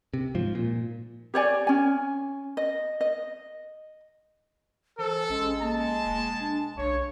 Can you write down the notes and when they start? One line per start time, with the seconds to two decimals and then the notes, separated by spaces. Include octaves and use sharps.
0.14 C3
0.35 G#2 F3
0.55 A#2
1.34 G4 C#5 D5 G#5
1.67 C#4 G#5
2.57 D#5
3.01 D#5
4.99 E3 A4 C5
5.29 A1 G#3 C#4
5.62 A#3 A5
6.06 E1
6.40 D4
6.78 B1 C#3 C#5